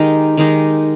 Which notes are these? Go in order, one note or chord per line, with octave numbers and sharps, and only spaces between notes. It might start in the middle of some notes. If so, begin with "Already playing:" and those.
Already playing: D#3 G#3 D#4 G4
D#3 G#3 D#4 G4